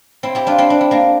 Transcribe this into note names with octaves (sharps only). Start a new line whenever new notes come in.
C4 E4
E4 G4
D4 F4
C4 E4
D4
E4
A#3 D4